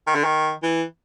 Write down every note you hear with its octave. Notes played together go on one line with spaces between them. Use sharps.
D#3
D3
D#3
E3